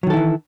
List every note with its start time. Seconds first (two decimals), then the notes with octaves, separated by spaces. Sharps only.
0.03 F#3
0.07 D#3
0.10 A4
0.14 E4
0.17 E3